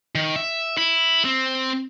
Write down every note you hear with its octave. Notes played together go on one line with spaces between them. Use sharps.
D#3
E5
E4
C4